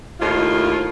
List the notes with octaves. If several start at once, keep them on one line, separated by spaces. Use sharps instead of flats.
D#2 A2 F4